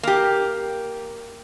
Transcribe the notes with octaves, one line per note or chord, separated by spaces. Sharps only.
A#3 G4